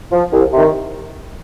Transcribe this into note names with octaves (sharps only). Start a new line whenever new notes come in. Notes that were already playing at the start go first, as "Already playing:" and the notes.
F3
C2
C3 D#3